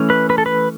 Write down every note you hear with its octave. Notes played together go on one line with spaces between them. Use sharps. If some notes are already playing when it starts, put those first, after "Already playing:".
Already playing: E3 A3 C#4
B4
B4
A4
B4